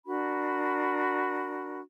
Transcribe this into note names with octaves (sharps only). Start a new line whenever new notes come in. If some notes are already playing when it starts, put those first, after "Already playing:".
D4 F#4 A#4 B5